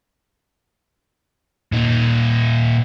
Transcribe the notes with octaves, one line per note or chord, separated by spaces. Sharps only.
A#2 D#4